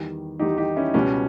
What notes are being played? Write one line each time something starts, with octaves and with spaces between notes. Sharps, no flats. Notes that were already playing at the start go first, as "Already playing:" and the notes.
Already playing: E2 D#3 G3
E2 D#3 G3 D#4 G4
D#4 G4
C#4 E4
C#2 B2 G3 C#4